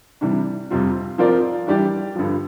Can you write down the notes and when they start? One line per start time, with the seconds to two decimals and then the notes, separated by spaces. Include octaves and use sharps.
0.21 C3 E3 G3 D4
0.71 F2 C3 G3 C4 F4
1.18 F3 C4 F4 A#4 D5
1.67 E3 G3 D4 G4 D5
2.15 G2 D3 F3